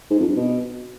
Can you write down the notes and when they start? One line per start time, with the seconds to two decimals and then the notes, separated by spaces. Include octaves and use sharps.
0.10 G#2
0.19 F2
0.28 G2
0.36 B2